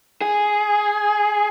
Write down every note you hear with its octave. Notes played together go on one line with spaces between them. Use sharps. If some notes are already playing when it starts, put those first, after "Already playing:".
G#4